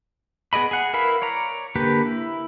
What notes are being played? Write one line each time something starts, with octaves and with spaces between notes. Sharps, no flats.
B3 G#4 D5 D#5 B5
G#4 F#5
E4 A#4 B4 F5 B5
C#5 D5 A#5
D3 A#3 G4 B4
E4